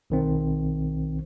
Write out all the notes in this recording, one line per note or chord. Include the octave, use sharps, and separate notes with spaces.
B1 D#3 C4